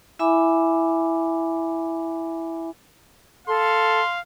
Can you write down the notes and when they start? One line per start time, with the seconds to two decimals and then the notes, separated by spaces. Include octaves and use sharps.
0.19 E4 E5 G#5 B5 D6
3.48 A4 F5 C6